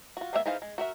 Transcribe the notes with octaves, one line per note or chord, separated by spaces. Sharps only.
F4 F#4
G#3 A#3 B3 G#4 E5
E3 D#4 G#4 C5 F5
G#3
F#4 A#4 E5